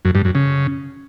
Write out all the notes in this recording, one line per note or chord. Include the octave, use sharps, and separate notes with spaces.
F#2
G2
F#2
C#3